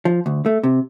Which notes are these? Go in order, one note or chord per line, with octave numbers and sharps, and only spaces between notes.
F3
D2
A3
C3